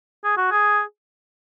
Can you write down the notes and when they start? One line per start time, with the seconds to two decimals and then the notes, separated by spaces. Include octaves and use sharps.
0.24 G#4
0.37 F#4
0.51 G#4